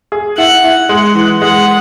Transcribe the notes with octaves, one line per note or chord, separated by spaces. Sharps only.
G#4
E4 F#5
E4
G#3 F#5
E3
G#3 F#5